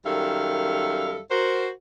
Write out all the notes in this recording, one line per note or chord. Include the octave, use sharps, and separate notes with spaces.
F#2 D#3 G3 A4 E5 F5
F#4 A#4 C5